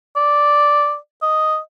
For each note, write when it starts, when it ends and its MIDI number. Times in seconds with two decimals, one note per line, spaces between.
0.16 0.96 74
1.22 1.58 75